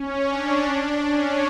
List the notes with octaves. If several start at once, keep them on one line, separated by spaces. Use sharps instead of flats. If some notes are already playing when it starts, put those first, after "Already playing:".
Already playing: C#4
D4
C#4